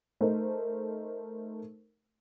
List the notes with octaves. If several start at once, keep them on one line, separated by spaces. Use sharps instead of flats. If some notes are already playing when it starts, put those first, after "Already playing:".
A3 D#4 A#4 C5